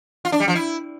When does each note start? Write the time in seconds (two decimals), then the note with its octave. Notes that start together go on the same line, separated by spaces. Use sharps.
0.25 F4
0.32 D4
0.40 G3
0.48 F3
0.55 E4